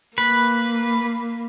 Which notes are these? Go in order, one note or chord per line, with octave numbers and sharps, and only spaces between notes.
A#3 B4